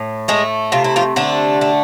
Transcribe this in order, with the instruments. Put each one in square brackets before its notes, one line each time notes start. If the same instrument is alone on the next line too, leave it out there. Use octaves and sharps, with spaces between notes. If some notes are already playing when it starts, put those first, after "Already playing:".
Already playing: [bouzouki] A2
G#3 A3 G#4
C3 F4
E4
F3 F4
D3 A3 D4
A3